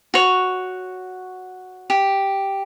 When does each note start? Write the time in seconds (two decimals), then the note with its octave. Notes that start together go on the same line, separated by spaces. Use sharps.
0.14 F#4 C#5
1.90 G4